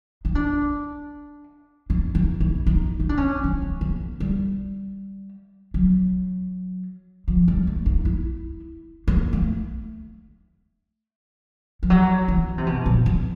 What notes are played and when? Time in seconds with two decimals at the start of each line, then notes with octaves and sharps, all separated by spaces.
0.25 D#4
0.35 D4
1.90 D4
2.15 D#4
2.40 E4
2.66 D#4
3.00 D#4
3.09 D4
3.17 C#4
3.44 C4
3.62 B3
3.81 A#3
4.20 G3
5.74 F#3
7.28 F3
7.48 G3
7.67 A3
7.86 D#4
8.05 E4
9.08 A#3
9.33 A3
11.83 F3
11.90 F#3
12.28 E3
12.58 C3
12.66 B2
12.86 A#2
13.06 E2